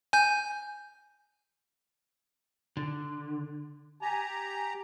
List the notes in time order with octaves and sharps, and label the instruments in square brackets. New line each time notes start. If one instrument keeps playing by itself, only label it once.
[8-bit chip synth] G#5 G6
[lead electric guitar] D3
[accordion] G4 A#5 [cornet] G#5